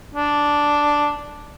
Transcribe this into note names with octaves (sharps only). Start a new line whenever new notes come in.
D4